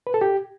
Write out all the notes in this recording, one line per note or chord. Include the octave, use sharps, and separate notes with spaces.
B4
A4
G4